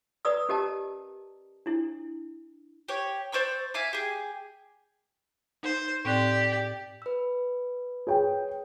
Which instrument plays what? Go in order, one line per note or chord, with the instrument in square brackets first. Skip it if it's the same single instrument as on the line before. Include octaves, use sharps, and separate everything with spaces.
[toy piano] B4 D5 A#5 D#6 E6
C#4 G4 A#4 D#5 A5 A#5
D4 E4
[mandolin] G4 C#5
C5 D5 C#6 E6
E5 F5 G#5 D6
G4 G#4
[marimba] D#4 [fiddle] C5
[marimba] A2 C4 F#6 [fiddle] G4 D5
[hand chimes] B4 E6
[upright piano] G#4 C#5 G5